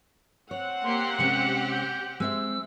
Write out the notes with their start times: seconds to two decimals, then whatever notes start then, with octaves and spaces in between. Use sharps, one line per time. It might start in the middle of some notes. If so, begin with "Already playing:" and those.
0.51 C4 C#5 F#5
0.84 A#3 G4 C6
1.18 C3 G#3 C#4 G4 C#7
1.72 G6
2.20 G#3 C4 E5 E6